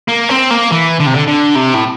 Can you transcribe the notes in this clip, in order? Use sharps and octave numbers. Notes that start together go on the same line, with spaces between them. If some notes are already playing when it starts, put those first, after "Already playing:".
A#3
C4
A#3
E3
D3
C3
D3
D3
C3
A2